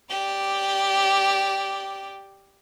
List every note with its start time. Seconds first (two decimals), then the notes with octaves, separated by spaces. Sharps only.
0.10 G4 D5